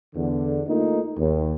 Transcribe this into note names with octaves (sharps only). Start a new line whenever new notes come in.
E2 D3
A3 A#3 D#4 F4
D#2